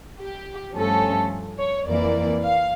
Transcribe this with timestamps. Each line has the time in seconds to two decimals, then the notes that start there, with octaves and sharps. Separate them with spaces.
0.18 G4
0.75 G2 F3 A3 C#4 A4
1.59 C#5
1.87 F2 E3 A#3 D5
2.43 F5